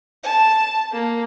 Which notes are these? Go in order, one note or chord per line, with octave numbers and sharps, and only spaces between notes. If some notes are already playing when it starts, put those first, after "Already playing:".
A5
A#3